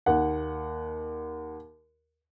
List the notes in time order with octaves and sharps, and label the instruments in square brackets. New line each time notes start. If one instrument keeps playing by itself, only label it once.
[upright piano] D#2 F#5